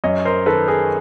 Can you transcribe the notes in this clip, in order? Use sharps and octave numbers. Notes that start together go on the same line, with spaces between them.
F#2 C#5 D#5
A#4 C5
D#3 A4 B4
G#4 A#4